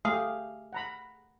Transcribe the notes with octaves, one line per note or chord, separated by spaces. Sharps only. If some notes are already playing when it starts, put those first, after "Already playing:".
A3 G4 G#4 F5
F#5 A#5 B5